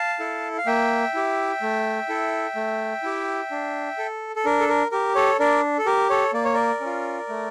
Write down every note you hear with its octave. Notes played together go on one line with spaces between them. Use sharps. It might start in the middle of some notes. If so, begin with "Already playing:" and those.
Already playing: F5 A5
E4 A4
F5
A#3 E5 G5
E4 G4
A3
E4 A4
A3
E4 G4
D4
A4
A4
D4 A#4
A4
A#4
G4 A#4
A4 C#5
D4 A#4 D5
A4
G4 A#4
A4 C#5
A#3 D5
C#5
A#4 D5
C#4
F4
A3